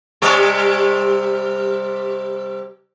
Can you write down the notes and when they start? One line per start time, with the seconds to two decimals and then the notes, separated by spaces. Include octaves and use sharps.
0.22 C3 G3 D5